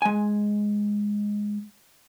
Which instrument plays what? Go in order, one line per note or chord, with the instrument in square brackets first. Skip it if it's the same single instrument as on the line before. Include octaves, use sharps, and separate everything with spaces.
[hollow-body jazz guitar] G#3 G#5